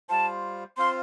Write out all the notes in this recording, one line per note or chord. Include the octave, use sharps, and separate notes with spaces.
G3 F4 C5 A5
C4 F4 C5 F5 C6